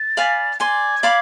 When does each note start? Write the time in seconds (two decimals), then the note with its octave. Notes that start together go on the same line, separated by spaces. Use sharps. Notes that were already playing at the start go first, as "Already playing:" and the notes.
Already playing: A6
0.17 D5 F5 G#5 B5
0.60 D5 G#5 C6 G#6
1.03 D5 F5 B5 D6